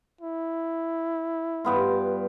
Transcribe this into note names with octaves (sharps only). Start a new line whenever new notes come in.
E4
G2 B3 F4